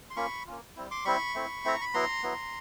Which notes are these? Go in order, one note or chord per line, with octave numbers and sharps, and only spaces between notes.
C6
A#3 C#4 F4 B5 C#6
A#3 C#4 F4
G3 C4 E4
C6 D6
G3 C4 E4 B5 C#6
A3 C4 E4
A3 C4 E4 A#5
B5
F#3 B3 E4 A#5 C6
F#3 B3 E4